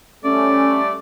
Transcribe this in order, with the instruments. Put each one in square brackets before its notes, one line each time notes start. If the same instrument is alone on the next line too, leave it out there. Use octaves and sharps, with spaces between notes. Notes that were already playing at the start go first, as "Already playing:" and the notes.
[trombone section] G3 A3 [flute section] C#4 [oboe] D5